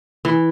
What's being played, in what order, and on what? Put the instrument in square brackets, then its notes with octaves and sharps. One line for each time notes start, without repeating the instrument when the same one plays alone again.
[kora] E3